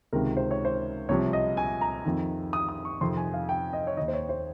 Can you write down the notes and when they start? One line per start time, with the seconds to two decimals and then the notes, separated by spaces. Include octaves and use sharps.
0.13 C#2 C3 D#3 A#4
0.37 C5
0.51 C#5
0.65 C5
1.09 C2 C3 F3 C#5
1.33 D#5
1.57 G#5
1.81 A#5
2.05 F2 D#3
2.53 D#6
2.69 D#6
2.85 C#6
3.01 F2 C3 D#3 C6
3.17 G#5
3.34 F5
3.49 G5
3.73 D#5
3.87 C#5
3.97 D#3 D#5
4.01 D#2
4.08 C5
4.13 C#5
4.29 C5